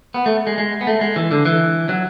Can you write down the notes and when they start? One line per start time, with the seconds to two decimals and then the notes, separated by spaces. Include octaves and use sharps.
0.14 B3
0.26 A3
0.47 G#3
0.58 G#3
0.81 B3
0.87 A3
1.01 G#3
1.16 E3
1.31 D3
1.45 E3
1.89 F#3